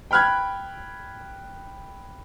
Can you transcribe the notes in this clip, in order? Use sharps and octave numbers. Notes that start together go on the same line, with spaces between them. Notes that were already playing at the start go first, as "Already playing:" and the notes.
G5 B5 F6 F#6 G#6